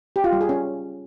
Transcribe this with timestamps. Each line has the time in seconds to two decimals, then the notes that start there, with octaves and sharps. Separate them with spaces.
0.16 G4
0.24 F4
0.32 G3
0.41 G#4
0.49 C#4